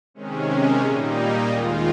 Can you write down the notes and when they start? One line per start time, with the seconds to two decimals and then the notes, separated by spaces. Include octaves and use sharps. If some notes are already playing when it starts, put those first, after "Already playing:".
0.14 C3 D#3 G#3 C#4
0.82 A#2 G3 A#3 D#4
1.49 D#2 D#3 G#3 F4